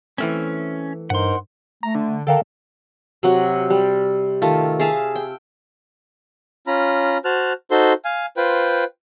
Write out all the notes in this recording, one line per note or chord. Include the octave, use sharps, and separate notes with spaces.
E3 A3 C4 C#4 F6
G2 D#4 A#4 C5 F#5 C6
A3 A#5
D3
D3 A4 A#4 F5 G5
C3 F#3 F#5
G3
D#3 A3 F4
G#4 E5 F5 A5
G5
C#4 F4 A#5 B5
F#4 C5 A5 F6 F#6
D#4 F#4 A4 C5 C6
F5 G#5
F4 B4 C5 G5